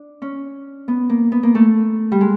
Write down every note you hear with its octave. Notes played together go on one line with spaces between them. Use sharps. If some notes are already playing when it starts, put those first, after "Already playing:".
Already playing: D4
C#4
B3
A#3
B3
A#3
A3
G3
G#3